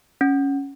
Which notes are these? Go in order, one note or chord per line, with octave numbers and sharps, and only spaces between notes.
C#4